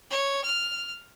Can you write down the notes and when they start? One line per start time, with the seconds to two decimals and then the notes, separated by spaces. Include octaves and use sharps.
0.11 C#5
0.44 F6